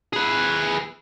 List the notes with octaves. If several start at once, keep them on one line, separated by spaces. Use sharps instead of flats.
G#4 B4